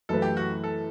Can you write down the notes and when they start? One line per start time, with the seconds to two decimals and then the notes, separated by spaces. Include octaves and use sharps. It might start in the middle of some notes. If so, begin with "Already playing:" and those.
0.09 F#2 E3 A3 E4 A4 B4
0.22 G4
0.37 F#4
0.64 A4